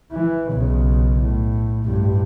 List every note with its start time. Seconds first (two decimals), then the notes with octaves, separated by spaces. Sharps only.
0.12 E3
0.52 B1 C#3
1.19 A2
1.86 A1 G2